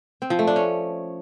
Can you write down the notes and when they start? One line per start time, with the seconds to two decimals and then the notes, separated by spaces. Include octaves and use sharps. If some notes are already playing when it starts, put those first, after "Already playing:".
0.22 C4
0.30 F3
0.39 A3
0.47 D4
0.56 C#4